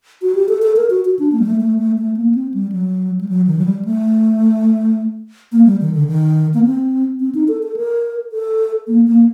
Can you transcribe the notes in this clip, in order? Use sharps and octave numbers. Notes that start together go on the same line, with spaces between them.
F#4
G4
A4
A4
A#4
F#4
F#4
D4
A#3
G3
A3
A3
A3
A3
A#3
C4
G3
F#3
G3
F#3
D#3
F#3
G3
A3
A#3
G3
D#3
D3
D#3
A#3
C4
C4
D#4
A4
A4
A#4
A4
A#3
A#3